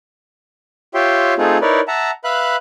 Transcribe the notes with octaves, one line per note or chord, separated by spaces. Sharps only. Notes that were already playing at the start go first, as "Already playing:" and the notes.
F4 G4 C#5 E5 G5 C6
A3 C4 D#4 F4 G#4
D#4 E4 A#4 B4 C#5 D5
E5 F#5 A5 A#5
B4 E5 F5 B5 F#6